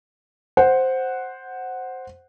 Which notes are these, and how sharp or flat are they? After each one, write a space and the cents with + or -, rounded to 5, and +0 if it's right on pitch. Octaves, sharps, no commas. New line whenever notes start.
C5 +0 F#5 +0